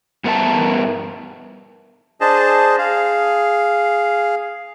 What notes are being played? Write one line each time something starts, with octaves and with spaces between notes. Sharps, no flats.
G2 B3 A#4 E5 A5
D4 G#4 C5 D#5 A5
G#4 F5